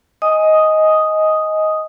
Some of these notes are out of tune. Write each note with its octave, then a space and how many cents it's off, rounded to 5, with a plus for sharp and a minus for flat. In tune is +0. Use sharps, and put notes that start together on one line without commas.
D#5 +10 G#5 +0 D#6 +0